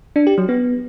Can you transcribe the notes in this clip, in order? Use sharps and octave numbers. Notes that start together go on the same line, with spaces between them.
D4
G4
F#3
B3